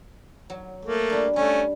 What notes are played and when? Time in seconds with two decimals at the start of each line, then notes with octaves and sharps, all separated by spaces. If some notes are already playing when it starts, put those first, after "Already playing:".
0.50 F#3
0.85 A3 A#3
1.10 G3 D4
1.36 G3 A3 C#4